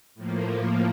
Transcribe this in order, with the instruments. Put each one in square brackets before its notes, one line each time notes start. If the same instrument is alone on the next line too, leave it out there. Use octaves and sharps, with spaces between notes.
[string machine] A2 F3 A#3